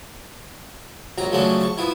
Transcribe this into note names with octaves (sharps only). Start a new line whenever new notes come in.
A#1 F#3 A#5
C#3 F3 F#3 A3 C#4 D4
A5 C#6
F3 B3 E4